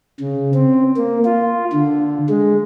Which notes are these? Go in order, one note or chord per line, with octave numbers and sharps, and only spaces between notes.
C#3
C4
A#3
F4
D3
G#3